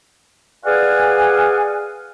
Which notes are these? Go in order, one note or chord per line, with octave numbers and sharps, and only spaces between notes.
G#4 B4 D5 F5 F#5 G#5